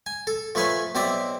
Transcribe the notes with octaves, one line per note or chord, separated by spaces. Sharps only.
G#5
A4
F3 A3 B4 C#5 G#5
B1 C4 C5 D5 E5